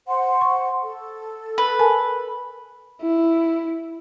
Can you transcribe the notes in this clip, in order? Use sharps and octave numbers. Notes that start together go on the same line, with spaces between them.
C5 F#5 C6
C#6
A4
B4
A#4 G#5 A5
E4